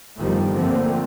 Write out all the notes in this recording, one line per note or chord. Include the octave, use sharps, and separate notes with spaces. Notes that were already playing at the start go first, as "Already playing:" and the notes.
G1 D#3 F3 G3 A3
D3 F3 A3 A#3 C4